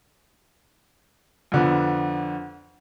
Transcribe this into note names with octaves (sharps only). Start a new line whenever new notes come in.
F2 D3 B3